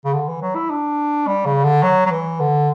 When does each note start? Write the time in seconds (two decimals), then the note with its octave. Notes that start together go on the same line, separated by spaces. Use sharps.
0.05 C#3
0.13 D3
0.28 E3
0.42 F#3
0.55 E4
0.70 D4
1.27 G3
1.45 C#3
1.64 D3
1.83 F#3
2.05 F#3
2.11 E3
2.40 D3